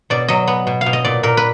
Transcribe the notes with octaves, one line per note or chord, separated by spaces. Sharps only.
B2 D5
F#3 D#5
B3
B2
F5
B2
D#5
A#2 D5
A#2 A#4
B4